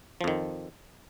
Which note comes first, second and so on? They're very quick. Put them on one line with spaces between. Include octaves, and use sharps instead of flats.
F3 F2 D#3